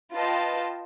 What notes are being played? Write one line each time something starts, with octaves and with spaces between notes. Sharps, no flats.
F4 B4 D#5 G5 A5